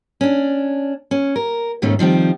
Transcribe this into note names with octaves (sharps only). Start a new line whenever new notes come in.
C#4 D4
C#4
A#4
D#2 G#2 B2 A3 C#4
D#3 F3 G3 C4